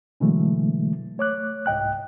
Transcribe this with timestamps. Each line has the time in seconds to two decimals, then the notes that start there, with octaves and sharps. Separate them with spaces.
0.20 B2 D3 E3 F#3 G#3 A3
1.18 A3 C#5 D6 F#6
1.66 C2 G#2 D#5 G5 F#6